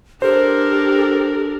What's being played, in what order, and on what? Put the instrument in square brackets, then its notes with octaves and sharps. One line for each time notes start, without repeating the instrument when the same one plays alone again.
[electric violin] D4 A#4 [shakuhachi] G4 [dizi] A4 [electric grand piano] C5